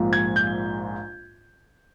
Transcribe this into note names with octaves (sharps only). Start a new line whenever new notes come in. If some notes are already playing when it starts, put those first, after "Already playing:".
Already playing: A#1 G#2 F3 A#3
G#6
G6